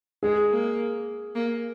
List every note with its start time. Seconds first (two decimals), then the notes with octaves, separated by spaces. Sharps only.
0.23 G#3 G#4
0.51 A#3
1.35 A#3